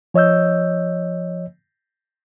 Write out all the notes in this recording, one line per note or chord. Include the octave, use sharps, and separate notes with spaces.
F3 C#5 D#5 E6 G6